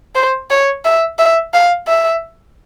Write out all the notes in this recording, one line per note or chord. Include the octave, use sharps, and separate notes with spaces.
C5
C#5
E5
E5
F5
E5